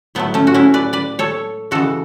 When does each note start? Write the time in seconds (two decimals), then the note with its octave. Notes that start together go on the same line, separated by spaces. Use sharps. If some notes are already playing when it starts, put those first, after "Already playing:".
0.15 A2 F#3 A3 B3
0.34 A3 C#4
0.47 F#4
0.54 C#4 E4
0.74 B4 D5
0.93 B4 D5
1.19 A4 C#5
1.71 C#3 E3 G#3 F#4 A4